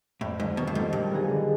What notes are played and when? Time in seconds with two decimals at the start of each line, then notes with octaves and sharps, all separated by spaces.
0.21 F2 A2
0.39 G#2 D3 F#3 A3
0.57 B2 D#3
0.67 G2
0.75 G#2 G3 C4 F4 A4
0.93 G2 A#2
1.11 G3 B3 D#4 G#4
1.29 D3